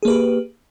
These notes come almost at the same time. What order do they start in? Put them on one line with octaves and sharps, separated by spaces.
G#4 A#3 B4 G4